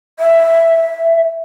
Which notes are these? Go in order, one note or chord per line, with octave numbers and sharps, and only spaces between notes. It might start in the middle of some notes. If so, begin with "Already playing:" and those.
E5